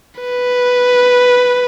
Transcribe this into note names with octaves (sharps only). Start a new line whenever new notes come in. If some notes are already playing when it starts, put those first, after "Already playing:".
B4